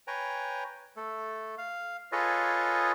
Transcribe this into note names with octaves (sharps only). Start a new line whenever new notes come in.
B4 C#5 G5 G#5 A#5
A3 A4
F5
F4 G#4 A4 B4 C#5 D#5